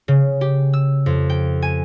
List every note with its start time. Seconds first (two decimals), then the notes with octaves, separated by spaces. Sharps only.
0.08 C#3
0.41 G4
0.73 E6
1.06 F2
1.30 G5
1.62 G#5